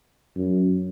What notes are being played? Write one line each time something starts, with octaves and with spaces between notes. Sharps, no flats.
F#2